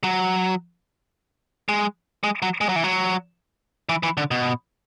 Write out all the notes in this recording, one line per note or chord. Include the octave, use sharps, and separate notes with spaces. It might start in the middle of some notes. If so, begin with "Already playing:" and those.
F#3
G#3
G#3
F#3
G#3
F#3
E3
F#3
E3
E3
D3
B2